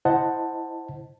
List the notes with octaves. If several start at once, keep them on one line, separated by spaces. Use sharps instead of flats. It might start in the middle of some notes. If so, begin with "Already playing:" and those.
E4 C5 D#5 F#5 A5